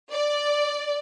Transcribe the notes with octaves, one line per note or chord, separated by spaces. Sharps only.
D5